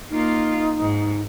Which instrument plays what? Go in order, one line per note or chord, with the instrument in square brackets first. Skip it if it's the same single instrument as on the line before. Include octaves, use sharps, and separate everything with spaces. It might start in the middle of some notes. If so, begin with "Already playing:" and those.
[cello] A#3 F4 [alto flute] D#4
[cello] G#2